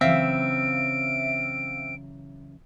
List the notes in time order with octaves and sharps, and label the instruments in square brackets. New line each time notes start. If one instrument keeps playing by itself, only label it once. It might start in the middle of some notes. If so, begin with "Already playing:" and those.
[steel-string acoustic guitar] C#3 E3 F#3 [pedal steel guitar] C4 [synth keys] E5 F5 [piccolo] D7